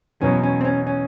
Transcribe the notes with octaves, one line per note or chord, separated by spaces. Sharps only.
E2 B2 F#3 B3 C#4
C#4
C4
C#4
C#4